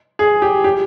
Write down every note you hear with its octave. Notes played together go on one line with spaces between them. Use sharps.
G#4
G4
G4